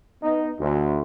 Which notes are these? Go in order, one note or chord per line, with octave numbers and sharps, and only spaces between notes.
B3 D#4
D2